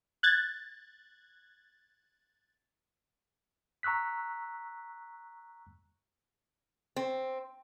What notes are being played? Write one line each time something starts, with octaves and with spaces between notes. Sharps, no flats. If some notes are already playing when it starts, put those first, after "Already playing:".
F#6 G#6 A6
A#5 C#6 E6 F#6 B6
C4